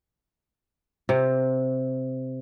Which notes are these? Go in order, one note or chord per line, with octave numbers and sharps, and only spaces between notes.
C3